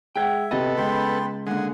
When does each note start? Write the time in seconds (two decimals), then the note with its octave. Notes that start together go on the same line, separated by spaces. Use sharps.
0.16 G#3 E5 F#5 G5 G#6
0.51 C3 B3 A4 D#5 G5
0.77 C#2 G5 B5 C6
1.47 D3 G#3 A#3 F#5